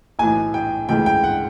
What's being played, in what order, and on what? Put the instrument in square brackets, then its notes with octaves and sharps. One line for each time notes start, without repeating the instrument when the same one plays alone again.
[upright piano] B1 A2 E3 G#5
G5
D2 C#3 E3 G#3 G5
G5
F#5